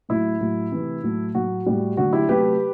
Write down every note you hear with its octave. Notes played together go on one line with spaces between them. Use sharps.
A2 F#3 A3 E4
A2 F#3 A3
C3 E3 A3
A2 F#3 A3
A2 F#3 A3 F#4
A2 G3
D3 F#3 A3 F#4
E4 G4
C3 F#3 A3 G4 B4